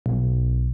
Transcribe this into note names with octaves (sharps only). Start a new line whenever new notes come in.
B1